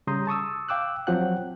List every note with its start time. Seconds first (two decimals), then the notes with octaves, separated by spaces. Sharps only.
0.07 C#3 G3 A#5 C6 D#6 G6
0.27 A5 C#6 D#6 E6
0.69 F5 G5 D6 E6 F#6
1.07 F3 F#3 C4 F#5 G5 F#6